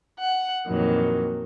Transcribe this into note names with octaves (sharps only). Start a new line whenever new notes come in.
F#5
F2 A#2 D#3 E3 F#3